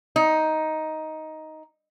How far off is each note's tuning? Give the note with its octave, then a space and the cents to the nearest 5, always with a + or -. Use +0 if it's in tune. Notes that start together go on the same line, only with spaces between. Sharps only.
D#4 +10